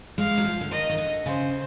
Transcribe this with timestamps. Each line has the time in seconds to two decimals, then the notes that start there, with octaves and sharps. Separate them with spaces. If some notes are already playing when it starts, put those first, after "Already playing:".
0.18 G#3 F5
0.38 F#3
0.44 F3
0.61 D3
0.71 D#3 D#5
0.89 D#3
0.98 D3
1.26 C#3 C5